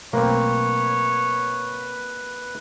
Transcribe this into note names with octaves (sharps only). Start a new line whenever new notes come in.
B2 F#3 A3 A#3 C4 B4 C#5